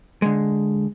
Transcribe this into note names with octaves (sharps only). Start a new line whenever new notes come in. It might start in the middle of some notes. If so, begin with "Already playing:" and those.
D3 G#3